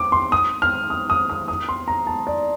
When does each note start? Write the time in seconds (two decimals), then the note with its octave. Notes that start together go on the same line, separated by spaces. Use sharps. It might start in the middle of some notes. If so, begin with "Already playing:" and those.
Already playing: D6
0.12 C6
0.32 D#6
0.62 F6
0.90 D#6
1.10 D#6
1.30 D#6
1.48 D#6
1.69 C6
1.88 A#5
2.07 A5
2.27 D5